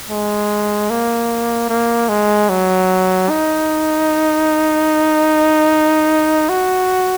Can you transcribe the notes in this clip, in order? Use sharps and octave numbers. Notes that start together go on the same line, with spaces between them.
G#3
A#3
A#3
G#3
F#3
D#4
F#4